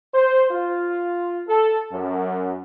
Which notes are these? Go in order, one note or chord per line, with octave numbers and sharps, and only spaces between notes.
C5
F4
A4
F#2